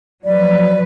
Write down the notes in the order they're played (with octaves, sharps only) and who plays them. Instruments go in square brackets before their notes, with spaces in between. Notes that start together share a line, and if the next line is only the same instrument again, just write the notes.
[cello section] F3 F#3 B4 [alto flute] D5